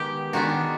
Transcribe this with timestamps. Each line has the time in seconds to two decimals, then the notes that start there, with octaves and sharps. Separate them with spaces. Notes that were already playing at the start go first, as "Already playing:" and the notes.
Already playing: D#3 G#3 B3 G4
0.33 D#3 G#3 B3 D4 F#4